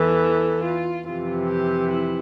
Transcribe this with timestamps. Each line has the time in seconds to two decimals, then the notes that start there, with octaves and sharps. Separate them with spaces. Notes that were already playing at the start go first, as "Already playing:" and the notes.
Already playing: E2 E3 A4
0.62 F4
1.05 F2 C3 E3 F4
1.48 G4
1.90 E4